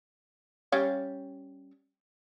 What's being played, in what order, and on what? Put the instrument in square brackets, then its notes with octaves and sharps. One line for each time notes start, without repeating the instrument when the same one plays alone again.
[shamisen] G3 C#4 F5